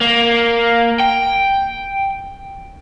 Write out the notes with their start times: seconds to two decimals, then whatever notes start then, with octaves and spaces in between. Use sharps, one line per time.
0.01 A#3
1.00 G5